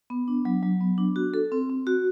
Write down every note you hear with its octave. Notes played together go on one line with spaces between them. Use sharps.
B3
D4
F#3
F#3
B3
D4
F#4
A4
C4
C4
F#4